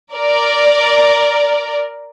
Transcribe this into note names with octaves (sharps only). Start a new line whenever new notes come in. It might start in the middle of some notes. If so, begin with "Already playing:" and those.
A#4 D5